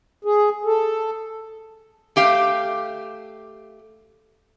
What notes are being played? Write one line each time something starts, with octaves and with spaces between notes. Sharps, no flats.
G#4
A4
A3 G4 F5